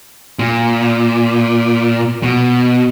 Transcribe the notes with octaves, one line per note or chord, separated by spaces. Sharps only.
A#2
B2